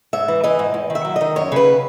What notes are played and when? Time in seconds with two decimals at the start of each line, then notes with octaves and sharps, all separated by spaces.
0.13 G#2 E5
0.28 E3
0.44 E3 D#5
0.59 G#2
0.74 E2
0.90 D#3
0.95 E5
1.05 F#3
1.16 D#3 D#5
1.36 F#2 C#5
1.52 C#3 B4